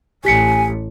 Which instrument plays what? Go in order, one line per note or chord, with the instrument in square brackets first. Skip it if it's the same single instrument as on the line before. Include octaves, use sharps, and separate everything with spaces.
[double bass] A1 [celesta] G4 B6 C#7 [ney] G#5